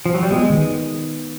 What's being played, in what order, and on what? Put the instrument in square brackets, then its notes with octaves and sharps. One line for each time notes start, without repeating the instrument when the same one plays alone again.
[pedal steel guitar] F3
F#3
G3
[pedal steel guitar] G#3 [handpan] B3
[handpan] D#3